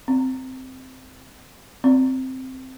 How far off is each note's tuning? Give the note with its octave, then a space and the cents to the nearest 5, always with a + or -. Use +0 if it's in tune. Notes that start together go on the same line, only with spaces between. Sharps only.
C4 -10
C4 -5